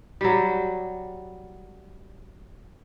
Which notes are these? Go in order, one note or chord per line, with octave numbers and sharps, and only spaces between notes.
F#3 G3